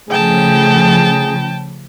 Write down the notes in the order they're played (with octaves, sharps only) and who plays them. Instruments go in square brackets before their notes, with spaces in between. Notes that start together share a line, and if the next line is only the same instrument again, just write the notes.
[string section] C#3 F3 [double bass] A3 [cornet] G#4 [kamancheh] G5 A5